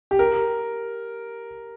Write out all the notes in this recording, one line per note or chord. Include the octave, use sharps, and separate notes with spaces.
G4
A#4